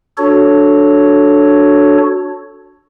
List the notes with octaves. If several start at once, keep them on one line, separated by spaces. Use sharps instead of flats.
D4 F#4 A4 C#5